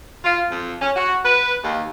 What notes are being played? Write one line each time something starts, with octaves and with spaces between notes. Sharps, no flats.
F4
F2
C#4
F#4
B4
D#2